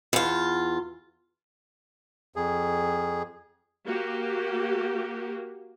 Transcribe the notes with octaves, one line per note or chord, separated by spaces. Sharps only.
E2 F4
F2 G#4
A#3 F#4 G4